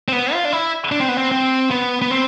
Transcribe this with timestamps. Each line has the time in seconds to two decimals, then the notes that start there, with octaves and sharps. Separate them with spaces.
0.08 C4
0.12 B3
0.33 F4
0.45 D4
0.53 E4
0.92 D4
1.00 C4
1.09 B3
1.17 C4
1.32 C4
1.71 B3
2.02 B3
2.11 C4